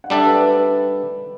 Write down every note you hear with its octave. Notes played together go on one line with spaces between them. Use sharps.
F#5
G3 D4 A4 E5 G5
B4
B4